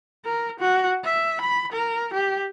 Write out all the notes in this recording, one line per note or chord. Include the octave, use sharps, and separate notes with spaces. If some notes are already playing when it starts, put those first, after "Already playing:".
A#4
F#4
E5
B5
A#4
G4